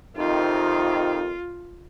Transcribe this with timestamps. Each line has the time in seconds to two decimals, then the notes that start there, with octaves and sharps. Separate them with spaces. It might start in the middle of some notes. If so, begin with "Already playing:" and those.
0.17 F2 C3 D#3 D#4 F4